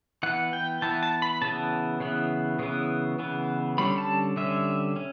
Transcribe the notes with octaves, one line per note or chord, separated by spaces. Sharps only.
E3 B3 F#5
G5
E3 B3 A5
A5
B5
C#3 E3 B3 A5
C#3 E3 B3
C#3 E3 B3
C#3 E3 B3
D3 G3 C#4 B5
A5
D3 G3 C#4 E5
C#4